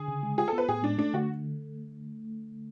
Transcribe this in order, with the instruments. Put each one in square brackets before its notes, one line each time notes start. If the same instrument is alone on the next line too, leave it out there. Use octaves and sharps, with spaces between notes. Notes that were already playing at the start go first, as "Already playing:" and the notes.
Already playing: [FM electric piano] D3 [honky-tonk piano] G#4
[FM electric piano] C#3
G#3
[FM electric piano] F4 [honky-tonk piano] G#4
[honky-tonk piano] A4
[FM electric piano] B3
[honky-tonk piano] B4
[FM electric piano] A2 [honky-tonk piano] G#4
[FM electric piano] G#3 [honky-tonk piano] D4
[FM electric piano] A3 [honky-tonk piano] D4
[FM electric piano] D3 [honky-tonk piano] F#4